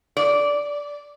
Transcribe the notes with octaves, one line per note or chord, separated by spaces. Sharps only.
D5